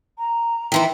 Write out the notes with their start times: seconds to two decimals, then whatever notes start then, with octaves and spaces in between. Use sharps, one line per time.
0.18 A#5
0.72 D#3 E3 E4 G5 C6